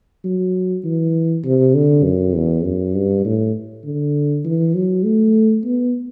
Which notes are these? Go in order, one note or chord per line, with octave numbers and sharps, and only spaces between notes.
F#3
E3
C3
D3
F#2
E2
F#2
G2
A2
D3
E3
F#3
A3
B3